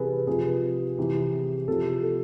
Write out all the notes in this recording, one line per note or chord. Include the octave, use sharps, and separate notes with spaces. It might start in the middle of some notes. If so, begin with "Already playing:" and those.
Already playing: C3 E3 G#4 A4 B4
C3 F3 G#4 B4
C3 E3
C3 F3 A4
A4